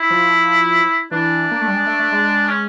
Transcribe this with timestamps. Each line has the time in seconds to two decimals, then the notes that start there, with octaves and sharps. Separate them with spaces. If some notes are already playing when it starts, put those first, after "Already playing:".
Already playing: E4
0.10 F3
1.11 E3 D4
1.51 A#3
1.61 A3
1.68 G3
1.74 G#3
1.87 A3
1.99 A3
2.12 G#3
2.49 C#4